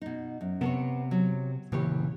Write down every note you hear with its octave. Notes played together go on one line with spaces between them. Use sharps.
B2 D#4
F#2
C3 B3 A#4 C#5
F#3
D#1 C#3 E3 A#3 G4 C#5